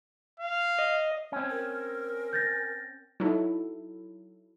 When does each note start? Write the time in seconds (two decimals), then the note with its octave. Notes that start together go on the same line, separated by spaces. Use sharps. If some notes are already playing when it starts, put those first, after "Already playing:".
0.40 F5
0.78 D#5
1.32 C4 C#4
1.50 A#4
2.33 G6 A6 A#6
3.20 F#3 D#4 E4 A4